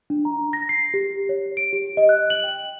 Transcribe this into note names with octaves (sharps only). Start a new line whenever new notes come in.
D4
A#5
A#6
C7
G4
C#5
D7
G4
D#5
F#6
F#7
G5